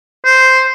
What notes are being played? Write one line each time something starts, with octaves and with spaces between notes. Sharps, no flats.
C5